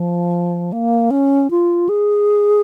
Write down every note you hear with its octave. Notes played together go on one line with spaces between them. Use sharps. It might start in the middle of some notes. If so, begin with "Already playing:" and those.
Already playing: F3
A#3
C#4
F4
G#4